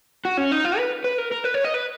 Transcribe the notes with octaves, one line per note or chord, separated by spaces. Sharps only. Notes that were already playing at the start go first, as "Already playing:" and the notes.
F#4
C#4
D#4
F4
B4
B4
A#4
A#4
B4
C#5
D#5
B4